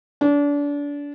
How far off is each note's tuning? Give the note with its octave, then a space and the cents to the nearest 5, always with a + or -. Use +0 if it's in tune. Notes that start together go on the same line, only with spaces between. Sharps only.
D4 -30